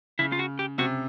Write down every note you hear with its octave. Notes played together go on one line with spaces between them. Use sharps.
C#3 E4
F4
F#4
G4
C3 F#4